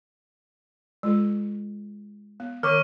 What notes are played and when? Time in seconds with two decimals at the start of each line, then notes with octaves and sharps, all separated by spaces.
1.03 G#3 F4 A4
2.40 B3
2.63 D#3 A#4 C#5 C#6 D6 F6